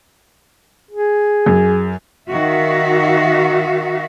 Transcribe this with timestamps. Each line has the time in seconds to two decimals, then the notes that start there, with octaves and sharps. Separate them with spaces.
0.91 G#4
1.46 F#2
2.31 D#3 F#4 E5 F5